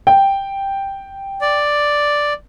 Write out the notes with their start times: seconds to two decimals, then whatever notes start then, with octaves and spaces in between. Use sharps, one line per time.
0.07 G5
1.41 D5